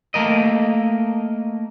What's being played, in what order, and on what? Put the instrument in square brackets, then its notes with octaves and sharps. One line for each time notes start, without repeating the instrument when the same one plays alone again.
[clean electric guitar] A3 A#3 A#4 D#5